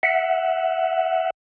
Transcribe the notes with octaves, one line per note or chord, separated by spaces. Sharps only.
E5 F#5